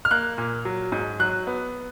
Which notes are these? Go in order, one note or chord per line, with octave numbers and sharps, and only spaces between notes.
F6
A#3 F#6
A#2
F#3
G#2
F#3 F#6
B3